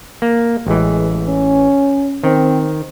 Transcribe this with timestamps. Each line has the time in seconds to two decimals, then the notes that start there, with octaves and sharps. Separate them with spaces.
0.22 A#3
0.67 A1 E3 G#3
1.27 C#4
2.24 D#3 C4